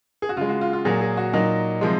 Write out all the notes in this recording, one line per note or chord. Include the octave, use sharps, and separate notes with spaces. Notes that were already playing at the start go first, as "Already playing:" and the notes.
G#4
F#4
C#3 G#3 F4
F#4
F4
F4
A#2 F#3 A#3 G#4
G#4
F#4
A#2 F#3 A#3 D#4
C3 F3 G#3